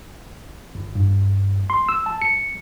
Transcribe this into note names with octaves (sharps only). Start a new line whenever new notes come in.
G1
G2
C6
E6
A5
C#7